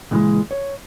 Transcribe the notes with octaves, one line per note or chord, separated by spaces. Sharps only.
C#2 A#2 E3 G3 G#3
C#5